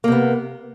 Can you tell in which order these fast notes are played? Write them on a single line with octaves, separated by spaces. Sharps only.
A#3 C3 B3